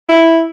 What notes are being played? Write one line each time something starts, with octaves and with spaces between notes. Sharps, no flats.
E4